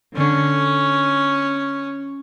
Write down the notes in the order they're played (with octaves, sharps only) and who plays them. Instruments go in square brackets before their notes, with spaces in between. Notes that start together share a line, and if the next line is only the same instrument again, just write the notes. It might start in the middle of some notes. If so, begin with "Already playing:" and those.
[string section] D3 [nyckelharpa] C#4